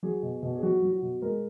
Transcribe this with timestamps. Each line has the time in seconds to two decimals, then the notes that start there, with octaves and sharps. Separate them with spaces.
0.03 F#3 G#4
0.23 B2
0.43 B2
0.56 G#4
0.63 F#3 F#4
0.82 F#3
0.92 F#4
1.02 B2
1.22 G#3 A#4